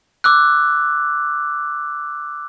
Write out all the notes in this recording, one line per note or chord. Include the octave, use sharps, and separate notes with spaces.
D6 E6 F#6